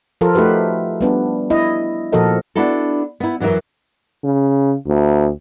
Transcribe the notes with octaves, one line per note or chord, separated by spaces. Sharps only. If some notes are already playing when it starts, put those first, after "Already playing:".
F3 F4 A4 A#4
A3 D#4 F#4 G4 B4
G3 B3 D4
E4 D#5
A#2 F3 F#4 A4 A#4 D#5
B3 D4 E4 F#4 A4
B3 E4
F#2 E3 F#3 A#4 E5
C#3
D2